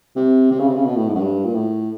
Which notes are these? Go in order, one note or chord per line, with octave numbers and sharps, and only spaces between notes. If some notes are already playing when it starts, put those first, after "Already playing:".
C3
C3
C#3
C3
C#3
B2
A2
G#2
F#2
G2
A#2
A2